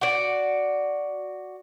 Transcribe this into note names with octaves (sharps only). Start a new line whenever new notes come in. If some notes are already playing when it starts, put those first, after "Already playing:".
F#4 D5